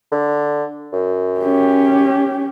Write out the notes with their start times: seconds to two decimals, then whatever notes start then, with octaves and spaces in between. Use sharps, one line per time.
0.12 D3
0.93 F#2
1.41 C#4 G4